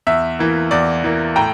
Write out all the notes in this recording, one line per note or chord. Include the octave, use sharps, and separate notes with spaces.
E2 E5
E3 A#3
E2 D5
E3 A#3
A2 G5 A#5